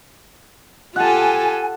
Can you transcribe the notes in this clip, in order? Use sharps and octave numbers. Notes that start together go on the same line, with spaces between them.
F4 G4 A4 F#5 G#5 A5